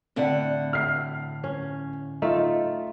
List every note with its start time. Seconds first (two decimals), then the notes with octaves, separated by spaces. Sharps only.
0.16 A2 D3 C4 D5 F#5
0.73 F6 C7
1.44 C#4
2.22 A3 D#4 F4 A4